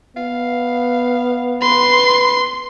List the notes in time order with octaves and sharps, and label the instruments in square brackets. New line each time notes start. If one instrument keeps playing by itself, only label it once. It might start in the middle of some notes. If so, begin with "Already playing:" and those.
[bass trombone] B3 [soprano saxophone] F5
[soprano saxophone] B4 [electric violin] C6